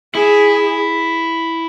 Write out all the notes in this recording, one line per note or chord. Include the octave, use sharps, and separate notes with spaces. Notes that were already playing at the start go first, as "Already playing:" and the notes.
E4 G#4